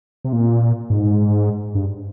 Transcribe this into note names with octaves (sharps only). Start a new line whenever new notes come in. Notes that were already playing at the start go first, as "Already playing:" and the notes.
C3
A#2
G#2
G2